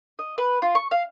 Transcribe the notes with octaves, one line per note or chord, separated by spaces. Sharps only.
D#5
B4
F4
C#6
F5